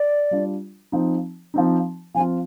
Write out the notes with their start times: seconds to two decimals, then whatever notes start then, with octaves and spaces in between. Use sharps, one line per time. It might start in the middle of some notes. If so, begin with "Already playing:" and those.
Already playing: D5
0.31 G3 D4 F4
0.92 F3 C4 D#4
1.54 F3 C4 D#4
2.15 F3 C4 F4 G#5